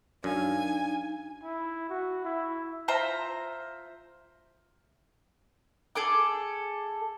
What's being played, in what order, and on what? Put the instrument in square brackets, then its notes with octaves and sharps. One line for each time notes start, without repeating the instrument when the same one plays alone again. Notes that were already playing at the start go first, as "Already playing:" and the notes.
[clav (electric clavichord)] F#2 [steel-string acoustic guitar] D4 F5 [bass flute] D#4 [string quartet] G#5
[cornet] E4
F#4
E4
[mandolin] F4 C5 E5 A#5
G#4 A4 D6